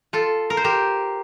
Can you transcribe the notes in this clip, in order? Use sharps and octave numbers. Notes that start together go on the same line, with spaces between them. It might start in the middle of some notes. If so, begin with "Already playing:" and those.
F4 A4
A#4
C5
G4 A#4